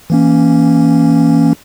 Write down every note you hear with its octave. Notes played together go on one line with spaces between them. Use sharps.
E3 A#3 C#4